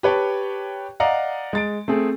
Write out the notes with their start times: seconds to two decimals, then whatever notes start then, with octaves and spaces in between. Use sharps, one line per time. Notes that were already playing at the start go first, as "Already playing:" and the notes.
0.03 G4 B4 C#5 G5 A5
1.00 D5 D#5 F5 F#5 A#5
1.53 G#3 A6 D7
1.88 A3 C4 G#4